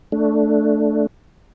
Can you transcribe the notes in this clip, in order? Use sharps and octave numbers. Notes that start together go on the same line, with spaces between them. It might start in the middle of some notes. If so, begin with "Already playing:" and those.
A3 D4